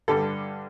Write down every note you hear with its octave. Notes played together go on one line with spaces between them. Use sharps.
G2 D3 G3 A4